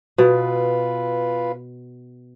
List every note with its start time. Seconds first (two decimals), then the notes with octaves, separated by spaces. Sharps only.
0.18 B2 F4 B4